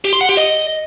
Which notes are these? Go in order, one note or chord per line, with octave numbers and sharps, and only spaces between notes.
G4
C6
F#5
G4
D#5